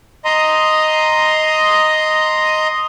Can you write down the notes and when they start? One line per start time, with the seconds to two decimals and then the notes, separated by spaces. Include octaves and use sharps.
0.25 D#5 A#5 C6 D#6